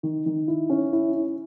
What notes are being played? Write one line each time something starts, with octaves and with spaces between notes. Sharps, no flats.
D#3
D#3
E4
C#4
E4
E4